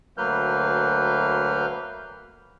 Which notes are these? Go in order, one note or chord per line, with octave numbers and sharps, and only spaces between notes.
D2 F#3 A#3 B4 F6 G6